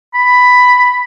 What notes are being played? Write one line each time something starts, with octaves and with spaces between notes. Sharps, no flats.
B5